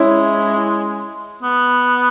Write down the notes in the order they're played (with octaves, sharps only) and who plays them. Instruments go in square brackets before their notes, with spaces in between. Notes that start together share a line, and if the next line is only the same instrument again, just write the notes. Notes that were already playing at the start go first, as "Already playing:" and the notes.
Already playing: [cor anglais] G#3 [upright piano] C#4 E4
[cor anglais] B3